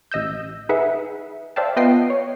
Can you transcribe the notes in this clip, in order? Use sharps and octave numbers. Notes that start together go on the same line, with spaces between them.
A1 D#5 E6 G6
D#4 G#4 B4 E5 F#5
C5 D5 E5 F5 G5 A5
B3 F4 B4 D#5 G5 C7
C#5